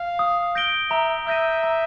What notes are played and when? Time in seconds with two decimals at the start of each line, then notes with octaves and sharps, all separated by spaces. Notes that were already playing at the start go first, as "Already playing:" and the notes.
Already playing: F5
0.19 D#6
0.55 G6 A#6 D7 G7
0.91 E5 A#5
1.27 E5 D#6 G6 A#6 D#7
1.63 A#5